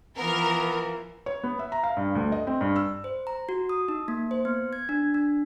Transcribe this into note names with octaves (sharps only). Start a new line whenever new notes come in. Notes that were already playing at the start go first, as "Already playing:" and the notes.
E3 F3 B3 A#4
C#5
B3
E5
A#5
F5
G2
D2
D#5
C4
G2
E6
C5
A#5
F#4
D#6
D#4
A#3
C5
B3
G#6
D4
D4